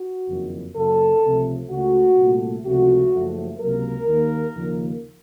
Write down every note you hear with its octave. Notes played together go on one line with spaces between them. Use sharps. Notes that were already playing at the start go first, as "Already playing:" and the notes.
Already playing: F#4
F#1 F2 D#3
F#2 C#3 F#3 A#3 A4
C#2 C3 F3 A3
C#2 C#3 A3 F#4
C2 A#2 A3
C#2 C3 F3 A3 F#4
F#1 F#2 F3 A3
C#2 C3 F#3 A#3 A#4
D#2 D#3 A#3
D#2 C#3 F3 A#3